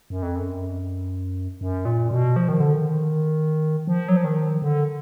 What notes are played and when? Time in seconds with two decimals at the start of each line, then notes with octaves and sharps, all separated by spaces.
0.10 F#2
0.23 F2
0.36 F#2
1.61 F#2
1.85 A#2
2.11 B2
2.36 F3
2.49 D#3
2.60 D3
2.73 D#3
3.87 F3
4.08 F#3
4.17 F3
4.24 D#3
4.62 D3